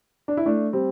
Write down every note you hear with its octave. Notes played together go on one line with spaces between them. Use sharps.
D4
E4
A3 D4
G3 C4